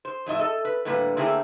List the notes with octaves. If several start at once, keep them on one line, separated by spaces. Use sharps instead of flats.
C5
F2 A2 D#5 E5
A4 D#5
B4
A2 D3 G3 A#3 B4
D3 A3 A#3 C4 E4 G#4